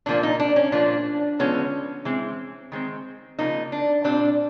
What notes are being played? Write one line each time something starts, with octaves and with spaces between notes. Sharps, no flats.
A#2 F3 A#3 D4
D#4
D4
C#4
A#2 F3 A#3 D4
D3 F3 G#3 B3 C#4
E3 G#3 C4
D#3 G#3 C4
C#3 F3 A#3 D#4
D4
A#2 G3 C4 D4